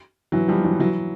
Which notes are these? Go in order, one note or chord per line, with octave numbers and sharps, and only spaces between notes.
E3 F#3
F3 G3
E3 F#3
E3 F#3